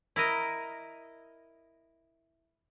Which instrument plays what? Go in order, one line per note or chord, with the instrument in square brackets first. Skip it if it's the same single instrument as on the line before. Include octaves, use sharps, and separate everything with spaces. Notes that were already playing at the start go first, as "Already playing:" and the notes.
[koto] E4 A#4 D#5